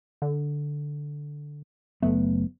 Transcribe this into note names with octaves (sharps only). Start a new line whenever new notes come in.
D3
F#1 F#3 A3 B3